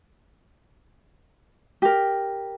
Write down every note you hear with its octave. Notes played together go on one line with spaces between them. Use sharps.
G4 A#4